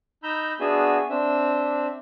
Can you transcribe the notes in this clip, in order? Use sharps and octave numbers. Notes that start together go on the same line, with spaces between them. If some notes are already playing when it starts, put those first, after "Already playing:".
D#4 A#5 B5 E6 G6
B3 D4 F#4 G#4 E5 G#5
C4 D4 E5